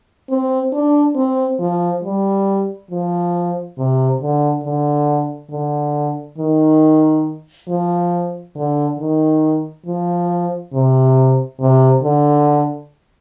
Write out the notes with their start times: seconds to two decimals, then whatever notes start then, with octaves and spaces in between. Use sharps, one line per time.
0.30 C4
0.73 D4
1.16 C4
1.60 F3
2.04 G3
2.91 F3
3.78 C3
4.21 D3
4.64 D3
5.51 D3
6.38 D#3
7.69 F3
8.56 D3
8.99 D#3
9.86 F3
10.73 C3
11.60 C3
12.03 D3